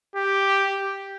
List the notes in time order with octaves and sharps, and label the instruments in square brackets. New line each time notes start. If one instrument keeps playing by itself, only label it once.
[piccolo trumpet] G4